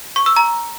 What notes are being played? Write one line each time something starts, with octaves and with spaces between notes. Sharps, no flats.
C#6
E6
A#5